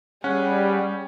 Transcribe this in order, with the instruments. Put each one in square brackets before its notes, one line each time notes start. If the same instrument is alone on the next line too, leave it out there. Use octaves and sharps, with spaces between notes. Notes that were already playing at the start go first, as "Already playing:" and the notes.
[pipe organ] G3 [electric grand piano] C#4 [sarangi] G#4 [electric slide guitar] F#5